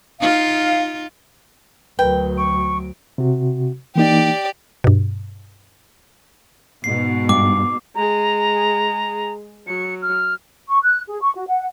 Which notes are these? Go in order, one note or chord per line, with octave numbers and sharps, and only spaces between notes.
D#4 F4 F5
D2 F#3 A#4 B4 G5
C#6 D7
C3 F#4
E3 A#3 D#4 G4 D5
G2 B2
G#2 B2 C7
G2 D6
G#3 G#4 A#5
F#3 C#7
F6
C#6
F#6
G#4
C#6
F#4
F#5